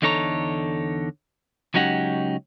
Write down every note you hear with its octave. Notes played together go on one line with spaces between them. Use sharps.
E2 D3 D#4 A4 C#5 A#5
C#2 F#3 C#4 D#4 G4 F#5